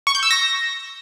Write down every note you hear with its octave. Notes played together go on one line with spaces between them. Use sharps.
C#6
G6
E6
A#6